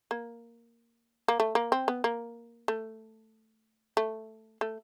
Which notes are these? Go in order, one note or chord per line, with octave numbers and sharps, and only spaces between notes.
A#3
A#3
A3
A#3
C4
B3
A#3
A3
A3
A3